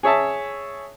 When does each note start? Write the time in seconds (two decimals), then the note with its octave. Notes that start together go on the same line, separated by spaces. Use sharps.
0.03 G#4 C#5 E5 A5